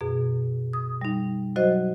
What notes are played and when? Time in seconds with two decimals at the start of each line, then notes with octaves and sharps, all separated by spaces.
0.01 F#2 B2 G#4
0.73 D#6
1.01 G3 D#4
1.56 F#3 F#4 C5 D#5